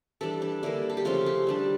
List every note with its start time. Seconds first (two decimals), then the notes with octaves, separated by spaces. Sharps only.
0.21 E3 G3 D4 A4
0.42 D4
0.63 D3 G3 A#3 E4
0.89 A4
0.97 G4
1.05 C#3 F3 A3 C#4 F4
1.26 G4
1.47 D3 G3 D4